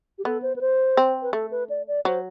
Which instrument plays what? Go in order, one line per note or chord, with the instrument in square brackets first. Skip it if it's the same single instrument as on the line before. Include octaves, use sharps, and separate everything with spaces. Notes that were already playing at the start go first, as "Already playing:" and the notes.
[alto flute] G4
[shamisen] B3 [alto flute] A4
[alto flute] C5
B4
C5
[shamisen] C4
[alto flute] B4
[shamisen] A3 [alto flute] A4
[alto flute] B4
D5
D5
[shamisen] F#3 [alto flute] C5